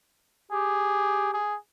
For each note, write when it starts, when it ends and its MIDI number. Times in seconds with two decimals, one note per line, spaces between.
0.51 1.36 67
0.51 1.29 68
1.33 1.56 68